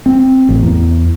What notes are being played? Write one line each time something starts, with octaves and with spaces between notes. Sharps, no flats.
C4
A1
E2